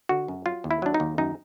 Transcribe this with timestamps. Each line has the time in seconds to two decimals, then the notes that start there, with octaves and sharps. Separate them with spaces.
0.09 D3 F#4
0.28 F#2
0.46 F#3 F4
0.64 D#2
0.71 E4
0.82 F#3 D4
0.94 D#4
1.00 D#2
1.18 F#2 D#4